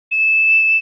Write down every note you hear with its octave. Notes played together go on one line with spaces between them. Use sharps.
E7